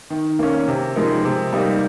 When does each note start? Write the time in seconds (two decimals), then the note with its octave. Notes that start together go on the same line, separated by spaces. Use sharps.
0.10 D#3
0.39 A#3 C#4
0.68 C3
0.96 F3 G#3 D#4 A#4
1.25 C3
1.53 G3 A#3 D#4